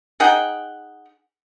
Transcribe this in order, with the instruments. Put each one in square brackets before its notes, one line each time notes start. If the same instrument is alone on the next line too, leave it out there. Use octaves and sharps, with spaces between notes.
[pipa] D#4 G#4 F#5 G5